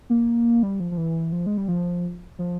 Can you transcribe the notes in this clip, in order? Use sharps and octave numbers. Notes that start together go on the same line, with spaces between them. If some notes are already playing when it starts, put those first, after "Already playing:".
A#3
G3
F3
F3
E3
F3
G#3
G3
F3
F3